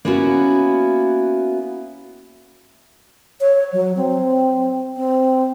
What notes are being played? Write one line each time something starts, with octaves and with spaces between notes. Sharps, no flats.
A#3 B3 C#4 E4 F#4
C#5
F#3
C4
C4